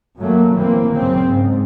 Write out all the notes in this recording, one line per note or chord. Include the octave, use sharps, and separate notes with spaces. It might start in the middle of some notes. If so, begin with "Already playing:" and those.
F#2 F#3 A3 A#3
E3 A#3 C4
F#2 C#3 C4
G#2